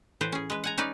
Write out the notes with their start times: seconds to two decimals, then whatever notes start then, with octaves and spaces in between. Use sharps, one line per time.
0.21 A2 E3 B4 C5
0.32 C#4 G#4
0.50 G#3 B4
0.64 F#5 G#5 A#5
0.78 C#4 D#4 B4 D5